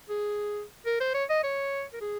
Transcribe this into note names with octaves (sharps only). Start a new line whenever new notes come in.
G#4
A#4
C5
C#5
D#5
C#5
A#4
G#4